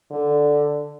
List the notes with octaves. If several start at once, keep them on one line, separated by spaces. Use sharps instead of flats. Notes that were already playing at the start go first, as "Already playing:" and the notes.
D3